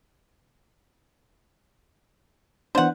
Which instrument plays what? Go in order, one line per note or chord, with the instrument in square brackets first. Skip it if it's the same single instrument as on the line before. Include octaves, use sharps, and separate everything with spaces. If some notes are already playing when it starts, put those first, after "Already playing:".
[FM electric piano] E3 B3 D4 [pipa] C5 F#5